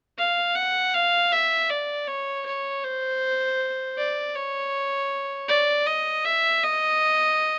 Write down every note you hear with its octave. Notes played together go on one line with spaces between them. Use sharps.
F5
F#5
F5
E5
D5
C#5
C#5
C5
D5
C#5
D5
D#5
E5
D#5